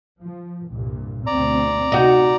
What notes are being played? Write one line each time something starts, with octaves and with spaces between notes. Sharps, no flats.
F3
C2 G2 A#2
D2 B2 C4 D5 A#5
C3 D#4 F#4